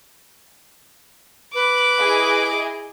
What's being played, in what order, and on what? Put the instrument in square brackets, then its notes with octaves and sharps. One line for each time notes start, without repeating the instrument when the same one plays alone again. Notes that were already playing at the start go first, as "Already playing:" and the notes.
[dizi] B4 [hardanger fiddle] D6
[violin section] E4 G#4 D#5